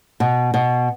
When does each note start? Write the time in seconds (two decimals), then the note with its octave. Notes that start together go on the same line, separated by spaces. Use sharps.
0.20 B2
0.54 B2